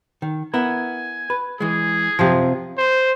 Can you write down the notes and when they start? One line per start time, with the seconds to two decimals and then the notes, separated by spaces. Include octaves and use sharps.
0.22 D#3
0.54 B3 E4 A#4 G#5
1.30 B4
1.60 E3 G#3 G#4
2.19 F#2 C3 F3
2.78 C5